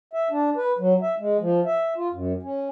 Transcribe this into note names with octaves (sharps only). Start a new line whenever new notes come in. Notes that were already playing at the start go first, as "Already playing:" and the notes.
E5
D4
B4
F#3
E5
G#3
F3
E5
F4
F#2
C#4